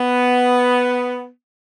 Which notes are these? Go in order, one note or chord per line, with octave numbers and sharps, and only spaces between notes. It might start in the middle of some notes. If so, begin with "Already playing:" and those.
Already playing: B3